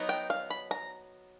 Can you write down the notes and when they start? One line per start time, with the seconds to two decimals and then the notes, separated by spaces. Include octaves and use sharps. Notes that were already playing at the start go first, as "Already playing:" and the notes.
Already playing: F#3 B3 D#4
0.09 G5
0.30 F5
0.50 B5
0.71 A#5